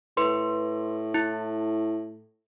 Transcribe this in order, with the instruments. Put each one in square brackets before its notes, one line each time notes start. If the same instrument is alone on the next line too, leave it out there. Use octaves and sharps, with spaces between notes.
[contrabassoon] A2 [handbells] B4 C6
[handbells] E4